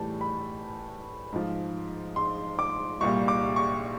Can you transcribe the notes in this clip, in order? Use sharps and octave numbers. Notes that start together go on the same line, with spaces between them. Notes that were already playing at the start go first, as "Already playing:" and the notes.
Already playing: A2 E3 G3 A5
B5
G#2 F3
C6
D6
C2 A#2 G3 C#6
D6
C#6